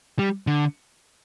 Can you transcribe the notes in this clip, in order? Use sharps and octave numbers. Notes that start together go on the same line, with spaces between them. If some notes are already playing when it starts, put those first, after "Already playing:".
G3
D3